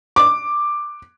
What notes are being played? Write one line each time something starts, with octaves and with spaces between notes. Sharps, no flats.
D6